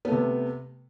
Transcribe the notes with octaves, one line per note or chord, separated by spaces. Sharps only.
C3 A3 B3